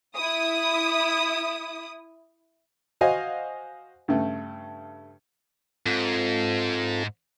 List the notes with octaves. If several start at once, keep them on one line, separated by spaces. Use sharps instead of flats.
E4 D#6
F#4 C5 D#5 F5 G#5
G2 C#3 A3
G#2 C4 F4 A4